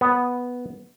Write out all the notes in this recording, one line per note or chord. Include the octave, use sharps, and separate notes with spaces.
B3